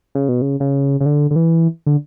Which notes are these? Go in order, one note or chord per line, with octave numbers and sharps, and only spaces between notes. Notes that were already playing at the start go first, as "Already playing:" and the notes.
C#3
B2
C#3
C#3
C#3
D3
D3
E3
D3